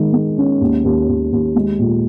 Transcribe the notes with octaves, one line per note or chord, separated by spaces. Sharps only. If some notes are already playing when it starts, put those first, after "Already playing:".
Already playing: D#3 G#3
G#3
C#4
D#2
D#2
D#2
D#2
G#3
A#2